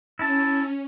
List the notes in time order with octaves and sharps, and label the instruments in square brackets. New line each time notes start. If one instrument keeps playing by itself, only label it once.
[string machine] C#4 [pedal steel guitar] E4 E5 A5